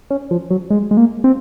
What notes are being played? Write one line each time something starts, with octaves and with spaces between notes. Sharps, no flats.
C#4
F3
F#3
G#3
G#3
A#3
C4